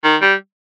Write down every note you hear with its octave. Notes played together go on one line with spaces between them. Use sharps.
D#3
G3